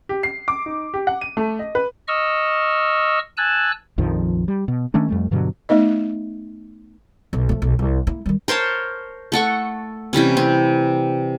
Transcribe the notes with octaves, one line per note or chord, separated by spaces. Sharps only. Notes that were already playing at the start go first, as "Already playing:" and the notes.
G4
C7
D6
D#4
G4
F#5
D#7
A3
D#5
B4
D#5 C#6 E6 F6
G#5 A5 E6 F#6
A#1 F2 D#3 F3
G3
B2
D#3 A3 C#4 D4
F2 G3 A3
G2 B2 D3 F#3
A3 B3 D#4 D#5
B1 B2
F3 A3
B1
C2
A#3 E4
D#3 G3
A#4 C5 C#5 A5
A3 A4 F#5 C#6
C3 E3 G3 C#4
C4